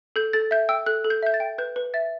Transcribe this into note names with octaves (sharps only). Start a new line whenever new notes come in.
A4 G6
A4 A6
E5 G6
G5 E6
A4 F#6
A4
G6
E5 G6
A6
G5
B4 G6
B4
E5 A6